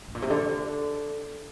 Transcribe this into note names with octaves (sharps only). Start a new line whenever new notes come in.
A2
A#2
C3
D3